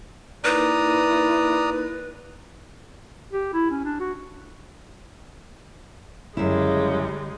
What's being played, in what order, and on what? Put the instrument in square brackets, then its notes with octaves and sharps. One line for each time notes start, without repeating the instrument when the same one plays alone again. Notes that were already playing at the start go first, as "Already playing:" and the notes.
[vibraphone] A#3 D#4 A#4 [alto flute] E4 [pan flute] B4 [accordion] D5 A#5 D#6
[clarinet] G4
E4
C#4
D4
F#4
[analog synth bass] G1 [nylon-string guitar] F#2 E4 [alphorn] C#3 [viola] G3 G#3